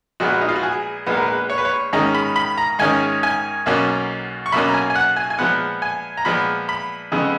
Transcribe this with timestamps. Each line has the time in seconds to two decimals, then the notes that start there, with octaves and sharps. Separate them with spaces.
0.20 A#1 A#2 G#3 B3 F#4
0.41 D#4
0.49 F4
0.56 F#4
0.63 G#4
1.06 A#1 A#2 G#3 B3 B4
1.16 A#4
1.26 B4
1.50 C#5
1.58 B4
1.65 C#5
1.93 G#2 D#3 G#3 C#4 A#5
2.15 B5
2.36 B5
2.58 A#5
2.79 G#2 D#3 G#3 C#4 G#5
3.23 G#5
3.66 B1 B2 A#3 C#4
4.46 C#6
4.52 B1 B2 A#3 C#4 B5
4.69 A#5
4.74 G#5
4.90 G#5
4.95 F#5
5.16 G#5
5.30 G#5
5.38 A#2 F3 G#3 B3 F#5
5.82 G#5
6.17 A#5
6.25 A#2 F3 G#3 B3 B5
6.69 B5
7.12 F2 C#3 G#3 B3